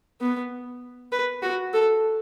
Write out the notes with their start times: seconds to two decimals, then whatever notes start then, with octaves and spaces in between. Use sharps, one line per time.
0.21 B3
1.12 B4
1.42 F#4
1.73 A4